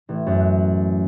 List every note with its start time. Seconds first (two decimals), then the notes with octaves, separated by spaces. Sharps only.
0.09 A1
0.26 F#2
0.40 F#6